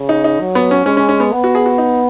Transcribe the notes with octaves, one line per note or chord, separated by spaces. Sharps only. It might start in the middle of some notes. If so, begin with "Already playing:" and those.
Already playing: C#3
D#4
D#4
F#3
B3
C#4
G#3 C#4
C#4
C#4
B3
B3
F#4
G#4
F#4
D#4